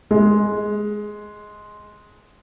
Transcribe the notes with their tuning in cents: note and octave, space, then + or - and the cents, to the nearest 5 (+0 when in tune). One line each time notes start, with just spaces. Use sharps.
G#3 +10